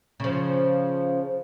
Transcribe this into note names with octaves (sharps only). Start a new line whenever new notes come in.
C#3 F3